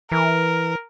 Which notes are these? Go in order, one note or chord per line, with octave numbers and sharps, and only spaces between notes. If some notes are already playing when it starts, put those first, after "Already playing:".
E3 A#4